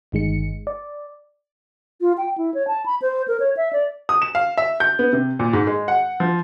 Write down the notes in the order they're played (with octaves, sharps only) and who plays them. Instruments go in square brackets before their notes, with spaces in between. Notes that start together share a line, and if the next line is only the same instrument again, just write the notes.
[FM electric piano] G1 D#3 G#3 C#7
D5
[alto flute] F4
G5
E4
C#5
A5
B5
C5
A#4
C#5
E5
D5
[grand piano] D#6
E7
F5
E5
G6
B3
C3
A#2
G#2
G#3
F#5
F3